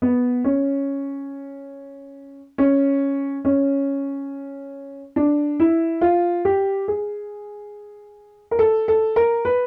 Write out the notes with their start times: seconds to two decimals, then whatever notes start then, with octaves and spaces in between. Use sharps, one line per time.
0.02 B3
0.44 C#4
2.58 C#4
3.45 C#4
5.16 D4
5.60 E4
6.01 F4
6.45 G4
6.88 G#4
8.51 A#4
8.59 A4
8.88 A4
9.16 A#4
9.45 B4